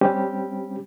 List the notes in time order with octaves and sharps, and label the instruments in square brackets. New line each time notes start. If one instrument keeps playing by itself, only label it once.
[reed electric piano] G3 C4 C#4 G4